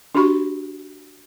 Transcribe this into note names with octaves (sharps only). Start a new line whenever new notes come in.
D4 F#4 G4 B5 C#6